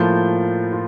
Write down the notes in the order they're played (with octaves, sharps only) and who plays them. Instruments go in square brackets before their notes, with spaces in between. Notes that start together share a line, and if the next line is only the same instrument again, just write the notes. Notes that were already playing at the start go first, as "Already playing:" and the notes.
Already playing: [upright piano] A2 F3 A#3 F4 G6
F4